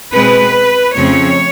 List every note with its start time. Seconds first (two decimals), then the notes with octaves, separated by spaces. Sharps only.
0.13 B2 G#3 C4 B4
0.95 F2 C#3 F3 A3 C4 C#5